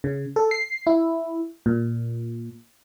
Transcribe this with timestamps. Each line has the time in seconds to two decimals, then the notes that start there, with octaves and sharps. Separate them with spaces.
0.04 C#3
0.36 A4
0.51 C7
0.87 E4
1.66 A#2